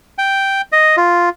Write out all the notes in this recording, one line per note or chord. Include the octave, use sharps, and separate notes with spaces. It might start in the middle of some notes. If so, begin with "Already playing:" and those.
G5
D#5
F4